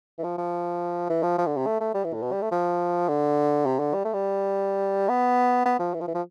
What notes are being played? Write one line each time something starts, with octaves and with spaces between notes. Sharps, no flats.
E3
F3
F3
E3
F3
F3
D3
C3
A3
A3
G3
E3
A2
B2
G3
A3
F3
D3
C3
D3
G3
A3
G3
B3
B3
F3
E3
F3
E3
F3